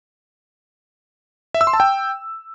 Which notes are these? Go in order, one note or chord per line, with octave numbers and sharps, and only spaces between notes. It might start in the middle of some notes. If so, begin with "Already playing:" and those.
E5
E6
C6
A5
G5